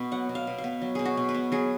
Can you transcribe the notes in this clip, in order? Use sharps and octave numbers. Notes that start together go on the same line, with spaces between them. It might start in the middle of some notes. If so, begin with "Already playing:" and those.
Already playing: B2 B3
F#3 F#5
B2
F5
B2
F5
B3
F#3
B2 G#4
F#4
B2
B4
B3
F#3 G#4